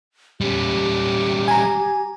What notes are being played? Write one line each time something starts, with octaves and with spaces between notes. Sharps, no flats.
G3 C#4 G4
G#5 A#5